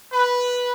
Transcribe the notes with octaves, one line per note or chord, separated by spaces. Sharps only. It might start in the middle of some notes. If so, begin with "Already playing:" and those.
B4